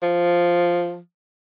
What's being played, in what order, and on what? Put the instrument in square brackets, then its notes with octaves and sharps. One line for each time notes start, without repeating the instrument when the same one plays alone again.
[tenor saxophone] F3